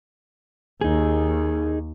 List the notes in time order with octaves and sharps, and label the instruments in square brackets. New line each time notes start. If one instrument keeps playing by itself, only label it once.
[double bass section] D#2 [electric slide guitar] D#4 G#4